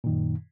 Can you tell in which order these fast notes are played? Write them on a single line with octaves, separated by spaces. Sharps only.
A#2 D#3 F#2